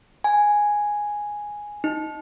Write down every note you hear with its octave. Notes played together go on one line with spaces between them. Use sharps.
G#5
D#4